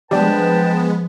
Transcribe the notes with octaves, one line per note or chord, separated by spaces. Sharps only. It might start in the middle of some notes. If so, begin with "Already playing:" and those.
F3 G3 G#3 B3 D4 B4 G5 A5